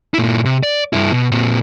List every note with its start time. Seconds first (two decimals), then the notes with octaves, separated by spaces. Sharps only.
0.14 A#2 E4
0.45 C3
0.63 D5
0.93 G2 E4
1.12 B2
1.32 A#2 C4